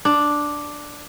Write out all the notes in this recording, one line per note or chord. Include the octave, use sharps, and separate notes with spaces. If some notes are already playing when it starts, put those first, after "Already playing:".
D4